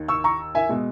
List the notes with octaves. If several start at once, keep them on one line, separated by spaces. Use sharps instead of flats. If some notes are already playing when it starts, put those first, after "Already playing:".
Already playing: D#2 D#3
C#6 E6
A#5 C#6
E5 G#5
B2 G#3